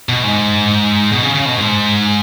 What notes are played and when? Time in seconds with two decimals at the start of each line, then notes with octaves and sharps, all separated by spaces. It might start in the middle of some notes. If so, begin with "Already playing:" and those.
0.09 B2
0.24 G#2
1.12 B2
1.23 C#3
1.35 C#3
1.45 B2
1.57 G#2